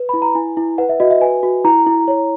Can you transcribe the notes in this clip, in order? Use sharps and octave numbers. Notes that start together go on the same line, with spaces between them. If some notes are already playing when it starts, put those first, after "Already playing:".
Already playing: B4
E4 B5
A#5
E4 G#5
E4
B4 F#5
E5
F#4 D#5
E5
B4 G#5
F#4
E4 A#5
E4
C#5